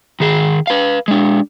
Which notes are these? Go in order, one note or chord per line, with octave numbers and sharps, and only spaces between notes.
D#3 G#4
B4 F5
G#3 D4